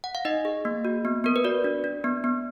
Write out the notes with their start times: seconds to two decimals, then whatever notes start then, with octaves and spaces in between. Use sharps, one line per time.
0.04 F#5
0.15 F5
0.25 D#4 D#5
0.45 G#4
0.65 A#3
0.85 F#4
1.05 B3
1.24 B3 A#4
1.36 B4
1.44 F#4 D5
1.64 D4
1.84 D4
2.04 B3
2.24 B3